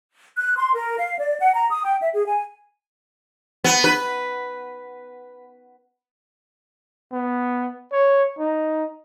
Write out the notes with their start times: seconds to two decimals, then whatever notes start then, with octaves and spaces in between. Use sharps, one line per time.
0.37 F#6
0.55 C6
0.74 A#4
0.97 F5
1.18 D5
1.39 F#5
1.53 A#5
1.70 D#6
1.84 G5
2.00 E5
2.14 G#4
2.25 G#5
3.64 B3
3.84 B4
7.12 B3
7.92 C#5
8.39 D#4